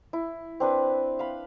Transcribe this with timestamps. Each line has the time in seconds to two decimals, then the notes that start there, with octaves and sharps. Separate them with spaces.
0.13 E4
0.60 C4 D4 B4
1.19 F5 B5